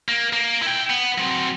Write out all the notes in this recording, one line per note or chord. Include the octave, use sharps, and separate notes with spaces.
A#3
A#3
E4 G5
B3
F#3 C4